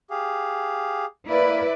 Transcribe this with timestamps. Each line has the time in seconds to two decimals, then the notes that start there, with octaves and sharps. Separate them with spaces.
0.10 G4 G#4 F5
1.28 A#3 E4 B4 D5 B5